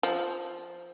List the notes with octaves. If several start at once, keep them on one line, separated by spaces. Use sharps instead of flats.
F3